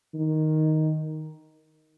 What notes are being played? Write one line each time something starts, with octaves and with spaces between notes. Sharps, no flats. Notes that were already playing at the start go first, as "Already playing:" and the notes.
D#3